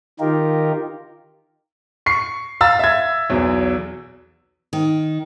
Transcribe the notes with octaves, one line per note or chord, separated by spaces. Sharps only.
D#3 D#4 F4 G4 A#4
C#6 C7
F5 A#5 E6 A6
E5 G#6
B1 E2 F#3
D#3